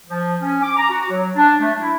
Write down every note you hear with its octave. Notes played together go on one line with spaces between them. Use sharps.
F3
C#4
D6
A#5
F#4
F#3
D4
A3
E4